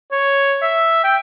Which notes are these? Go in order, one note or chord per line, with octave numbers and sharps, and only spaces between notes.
C#5
E5
G5